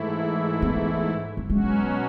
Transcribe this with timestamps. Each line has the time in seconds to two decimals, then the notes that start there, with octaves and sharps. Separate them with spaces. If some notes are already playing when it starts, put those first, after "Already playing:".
Already playing: G#2 E3 A3 E4
0.62 B3
1.37 A3
1.49 B2 F#3 G#3 C#4 F#4